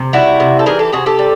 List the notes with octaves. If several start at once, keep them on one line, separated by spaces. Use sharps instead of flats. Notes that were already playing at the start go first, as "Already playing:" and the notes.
Already playing: C3
G3 E4 F#4
C3
A4
E3 G#4 A#4
G4 A4
C3 F#4 G#4
G4 A4
G3